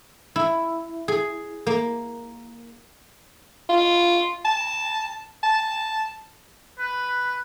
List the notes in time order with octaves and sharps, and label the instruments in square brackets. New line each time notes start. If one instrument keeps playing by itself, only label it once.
[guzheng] E4
G#4
A#3
[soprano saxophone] F4
A5
A5
[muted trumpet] B4